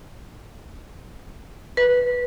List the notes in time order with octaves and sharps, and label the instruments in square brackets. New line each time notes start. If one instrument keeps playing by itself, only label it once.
[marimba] B4